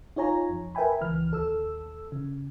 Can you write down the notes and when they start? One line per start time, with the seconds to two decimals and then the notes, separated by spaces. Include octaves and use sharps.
0.16 D#4 F4 C#5 G#5 A#5
0.50 F2
0.75 A#4 B4 E5 G5 G#5 B5
1.01 C#2 E3 F6
1.31 D#2 A4 E6
2.12 C#3